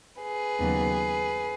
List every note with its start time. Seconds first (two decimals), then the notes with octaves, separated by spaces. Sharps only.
0.23 G#4 B4
0.58 D#2 C#3 F#3 B3